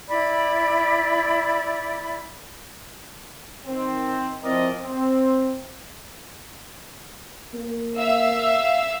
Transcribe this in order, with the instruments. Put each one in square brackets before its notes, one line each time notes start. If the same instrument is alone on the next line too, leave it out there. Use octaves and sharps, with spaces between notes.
[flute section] E4 D5 B5
[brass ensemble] D#3 C4
F3 C4 E4 A#4 D5 D#5
C4
[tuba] A#3
[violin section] E5 F5 E6